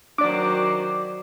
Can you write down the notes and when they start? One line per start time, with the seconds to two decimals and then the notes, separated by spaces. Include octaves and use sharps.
0.18 D#3 F#3 D4 C5 D5 D6